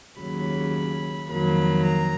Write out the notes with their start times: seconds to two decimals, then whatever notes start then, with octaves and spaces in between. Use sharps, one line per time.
0.20 D#2 C#3 F#3 B5
1.30 F2 D#3 F#3 A#3 B5
1.85 A#5